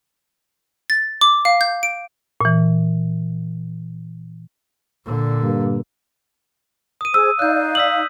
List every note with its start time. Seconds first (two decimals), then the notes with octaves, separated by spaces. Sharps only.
0.90 A6
1.21 D6
1.45 F5
1.61 G6
1.83 D7
2.41 A#2 E3
5.06 A#2 D3
5.42 G2 A#3
7.01 D#6 D#7
7.14 G#4 C5 E6
7.39 D#4 D5 F5 F#6 G6
7.75 D#6 E6 B6 F#7